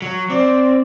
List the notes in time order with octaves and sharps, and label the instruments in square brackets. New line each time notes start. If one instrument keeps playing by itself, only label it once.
[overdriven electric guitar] F#3
[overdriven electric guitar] C4 [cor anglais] D5